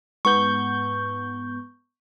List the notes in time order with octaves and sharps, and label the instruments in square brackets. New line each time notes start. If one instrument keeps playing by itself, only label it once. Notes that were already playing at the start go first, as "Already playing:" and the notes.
[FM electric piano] G#2 B3 G6 [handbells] C#6